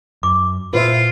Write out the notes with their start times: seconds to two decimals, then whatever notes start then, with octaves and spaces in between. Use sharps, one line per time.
0.23 F#2 D6
0.73 A#2 F4 B4 C5 E5